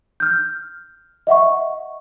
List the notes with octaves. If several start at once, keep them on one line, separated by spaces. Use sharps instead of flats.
F6 G6
D#5 E5 F#5 C#6